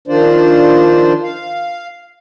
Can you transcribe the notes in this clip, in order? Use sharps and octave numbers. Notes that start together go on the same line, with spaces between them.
D#3 F3 D4 F4 C5 D5
F5